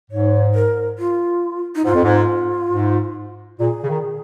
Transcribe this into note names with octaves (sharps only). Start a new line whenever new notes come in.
G#2 C#5
A#4
F4
D#4
G#2 F4
F2
G#2
G#2
A#2 G#4
C#3
D#3